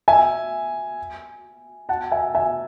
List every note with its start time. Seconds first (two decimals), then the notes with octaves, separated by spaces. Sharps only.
0.08 E5 G#5
1.89 F#5 A5
2.12 E5 G#5
2.35 E5 G#5